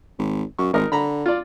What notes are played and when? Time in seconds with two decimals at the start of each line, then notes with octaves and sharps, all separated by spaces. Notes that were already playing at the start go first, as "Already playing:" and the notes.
0.19 G#1
0.59 F#2 C#6
0.73 G#1 D#4 A#4 D#5
0.92 D3 A#5 B5
1.26 F4 D5